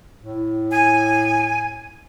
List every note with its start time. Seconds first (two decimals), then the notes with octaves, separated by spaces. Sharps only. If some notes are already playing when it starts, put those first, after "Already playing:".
0.21 A2
0.71 G#5